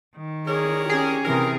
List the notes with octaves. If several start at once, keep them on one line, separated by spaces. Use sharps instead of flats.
D#3
D4 G#4 A#4 C#5
C#4 G4 G#4
C3 E3 A#4